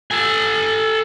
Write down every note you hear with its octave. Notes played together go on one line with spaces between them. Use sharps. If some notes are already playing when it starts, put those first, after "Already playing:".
A4 G#5